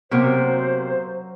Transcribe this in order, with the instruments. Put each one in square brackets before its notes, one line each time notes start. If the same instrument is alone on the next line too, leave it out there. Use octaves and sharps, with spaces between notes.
[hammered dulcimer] F#2 F#3 [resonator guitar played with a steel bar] C3 A#3 B3 [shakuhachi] C5